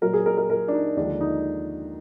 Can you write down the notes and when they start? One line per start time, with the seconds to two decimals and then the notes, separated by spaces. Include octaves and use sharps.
0.01 A#2 F#3 A#4
0.13 G#4
0.26 A#4
0.37 A#4
0.50 A#4
0.68 D4
0.73 D#4
0.97 D#2 D3 F3 G#3 D4
1.21 D#4